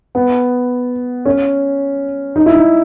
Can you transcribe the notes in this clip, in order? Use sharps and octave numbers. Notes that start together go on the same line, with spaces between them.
B3
C#4
D#4
E4
D#4